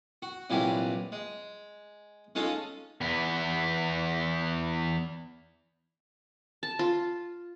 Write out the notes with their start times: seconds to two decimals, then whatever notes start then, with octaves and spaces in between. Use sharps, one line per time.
0.22 F#4
0.50 A#1 C3 E3 F#3 G3 G#5
1.12 G#3
2.35 G#3 C#4 D#4 F4 A4
3.01 E2 B3
6.63 A5
6.79 F4